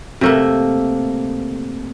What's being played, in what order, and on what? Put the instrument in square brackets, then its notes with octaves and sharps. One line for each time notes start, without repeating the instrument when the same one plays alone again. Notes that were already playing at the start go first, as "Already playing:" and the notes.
[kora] C3 A3 A#3